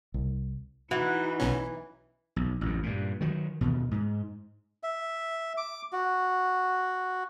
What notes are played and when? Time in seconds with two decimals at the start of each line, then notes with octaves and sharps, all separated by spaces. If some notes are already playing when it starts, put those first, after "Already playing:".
0.14 C2
0.91 E3 D#4 E4 F#4
1.40 B1 B2 C#4
2.36 B1
2.61 A1 F2
2.83 G2 A#2
3.21 D#3 F#3
3.61 D#2 B2
3.91 G#2
4.83 E5
5.57 D6
5.92 F#4